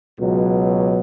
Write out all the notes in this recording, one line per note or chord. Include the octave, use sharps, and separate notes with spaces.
C#2 B2 F#3